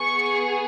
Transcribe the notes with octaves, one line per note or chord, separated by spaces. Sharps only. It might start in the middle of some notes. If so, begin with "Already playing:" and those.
Already playing: B3 G#4 C#6